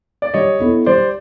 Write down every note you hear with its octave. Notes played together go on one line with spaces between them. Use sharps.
D5
G3 C#5 D#5
B3 E4 A4
G3 C5 D5